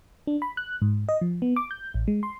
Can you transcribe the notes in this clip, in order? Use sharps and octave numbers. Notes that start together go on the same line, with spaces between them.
D4
B5
F#6
G#2
D#5
F3
B3
D6
G6
A1
G#3
C6